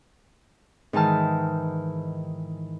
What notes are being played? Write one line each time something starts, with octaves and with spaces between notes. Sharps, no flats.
G#2 D#3 E3 A5 F6